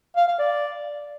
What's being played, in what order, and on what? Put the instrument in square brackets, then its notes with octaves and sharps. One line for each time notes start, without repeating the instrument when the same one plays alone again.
[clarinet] F5
F5
D5